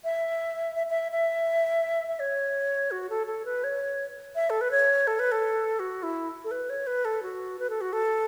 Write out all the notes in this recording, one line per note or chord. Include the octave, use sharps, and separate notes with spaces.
E5
E5
E5
E5
E5
C#5
F#4
A4
A4
B4
C#5
E5
A4
B4
C#5
A4
B4
A4
F#4
E4
A4
B4
C#5
B4
A4
F#4
B4
A4
F#4
A4